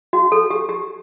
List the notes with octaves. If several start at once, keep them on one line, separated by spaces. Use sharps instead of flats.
F#4
A4
G4
G4